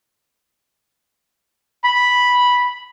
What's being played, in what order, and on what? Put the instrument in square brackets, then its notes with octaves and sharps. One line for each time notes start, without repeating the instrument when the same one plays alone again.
[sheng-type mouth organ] B5